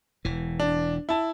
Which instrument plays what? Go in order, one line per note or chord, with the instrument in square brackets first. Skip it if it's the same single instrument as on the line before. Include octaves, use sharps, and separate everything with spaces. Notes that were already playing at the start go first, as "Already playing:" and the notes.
[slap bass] E1 E3
[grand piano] D4
E4 A5